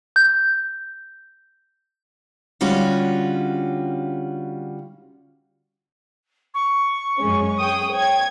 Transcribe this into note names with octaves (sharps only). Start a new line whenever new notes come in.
G6
D3 G3 C#4 F4 F#4
C#6
F#2 G#3 C#4
G#4 G5 D#6
C#5 G5 G#6